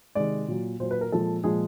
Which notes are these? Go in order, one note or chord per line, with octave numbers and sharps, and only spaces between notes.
C3 D#3 G#3 D5
A#2 F#3
A#2 F#3 C5
B4
A#4
A#2 F3 G#3 A4
A#2 F3 G#3 G#4